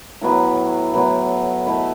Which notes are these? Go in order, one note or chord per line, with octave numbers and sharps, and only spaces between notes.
A2 F#3 B3 E4
A2 F#3 B3 E4
A3 E4 B4 D#5